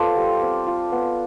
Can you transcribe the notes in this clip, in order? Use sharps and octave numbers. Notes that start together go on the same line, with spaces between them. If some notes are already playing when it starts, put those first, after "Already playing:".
Already playing: B3 F4 A4 C5 D5 A5
G3
C4
F4
B3